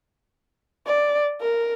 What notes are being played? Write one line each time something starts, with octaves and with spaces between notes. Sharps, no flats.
D5
A#4